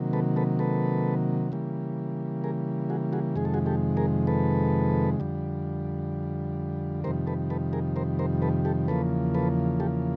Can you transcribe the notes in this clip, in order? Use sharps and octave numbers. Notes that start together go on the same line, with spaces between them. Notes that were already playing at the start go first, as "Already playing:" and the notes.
Already playing: C3 D#3 F#3 A#3
A4 B4
A4 B4
A4 B4
C#3 E3 G3 A#3
G#4 A#4
F#4 G#4
F#4 G#4
F2 C3 D#3 G#3 G#4
A4
F#4 G#4
G4 A4
G#4 A#4
A4 B4
F2 D3 G3
F2 C3 D#3 G3 A#4 C5
A4 B4
A4 B4
G#4 A#4
A#4 C5
A#4 C5
A4 B4
G4 A4
E2 C#3 F3 A#3 A4 B4
A4 B4
G4 A4